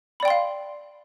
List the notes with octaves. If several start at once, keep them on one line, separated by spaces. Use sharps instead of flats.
D5 F5 G5 B5 C6